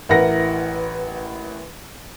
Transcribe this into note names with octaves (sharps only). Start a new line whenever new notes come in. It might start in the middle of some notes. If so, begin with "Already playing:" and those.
A1 E4 A#4 B4 F#5 A#6